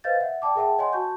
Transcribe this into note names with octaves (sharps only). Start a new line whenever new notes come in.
B4 C5 D#5 F5 G6 A6
E5 F#5
D5 G5 A5 D6
G#4 A#4 E5 F#5 G5 A5
C#5 D#5 F#5 G#5 C6
F#4 A5 C#6 G6